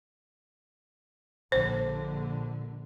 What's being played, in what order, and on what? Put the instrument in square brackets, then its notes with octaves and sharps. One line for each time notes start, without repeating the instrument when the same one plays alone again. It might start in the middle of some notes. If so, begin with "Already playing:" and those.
[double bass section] A#1 D3 [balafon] C5